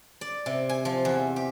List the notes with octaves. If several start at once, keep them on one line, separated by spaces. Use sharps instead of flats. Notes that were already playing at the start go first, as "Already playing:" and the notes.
D5
C3
G#5
F3
E2
G4